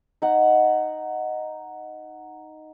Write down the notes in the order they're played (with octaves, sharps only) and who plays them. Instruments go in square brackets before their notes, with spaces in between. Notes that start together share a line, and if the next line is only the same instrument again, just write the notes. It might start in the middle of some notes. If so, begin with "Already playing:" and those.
[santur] D#4 F#5